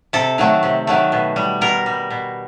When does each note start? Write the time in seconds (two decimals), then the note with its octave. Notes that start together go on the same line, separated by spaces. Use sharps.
0.13 C3 A4
0.38 D#3 F#3 A3
0.63 C3
0.87 D#3 F#3 A3
1.12 B2
1.36 G3
1.61 B2 A#4
1.86 G3
2.10 B2